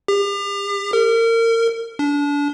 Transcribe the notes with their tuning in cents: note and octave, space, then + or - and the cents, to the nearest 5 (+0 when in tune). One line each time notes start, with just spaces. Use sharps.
G4 +40
A#4 -30
D4 -30